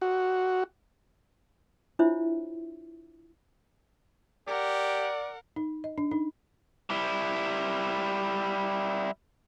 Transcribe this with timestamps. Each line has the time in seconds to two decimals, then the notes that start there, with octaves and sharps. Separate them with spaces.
0.02 F#4
1.99 D4 E4 F4 C5 C#5 E5
4.48 G4 A#4 D5 F#5
5.56 D#4
5.84 D#5
5.98 D4
6.11 D#4
6.90 G3 E4